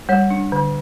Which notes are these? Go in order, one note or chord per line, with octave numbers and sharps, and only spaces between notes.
G3 C#5
D4
D3